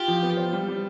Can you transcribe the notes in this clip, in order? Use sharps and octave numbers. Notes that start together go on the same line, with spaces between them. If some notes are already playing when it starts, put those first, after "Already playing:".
Already playing: F4 G4
F3
B3
C5
G3
G3